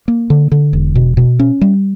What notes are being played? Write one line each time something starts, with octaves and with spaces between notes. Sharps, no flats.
A#3
D3
D3
E1
B2
B2
C#4
G3